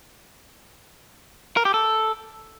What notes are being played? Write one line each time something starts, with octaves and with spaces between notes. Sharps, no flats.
A#4
G4
A4